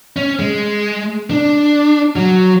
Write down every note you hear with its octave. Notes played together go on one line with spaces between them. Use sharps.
C#4
G#3
D4
F#3